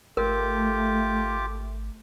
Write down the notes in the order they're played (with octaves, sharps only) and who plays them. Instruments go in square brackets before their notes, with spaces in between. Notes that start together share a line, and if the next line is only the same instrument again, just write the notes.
[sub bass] G#1 [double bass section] A3 [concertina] F4 G4 D6 [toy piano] A#4